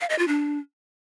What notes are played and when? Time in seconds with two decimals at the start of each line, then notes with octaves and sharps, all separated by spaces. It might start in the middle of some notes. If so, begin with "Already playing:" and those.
0.01 F5
0.10 D#5
0.19 F4
0.28 D4